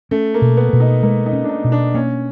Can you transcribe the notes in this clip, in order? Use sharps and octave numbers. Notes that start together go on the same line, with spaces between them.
A3 C#4
A#3
B2
B3
B2
D#4
G#3 A#3
D#4
C#4
D4
D#4
B2
D4
A#3 C#4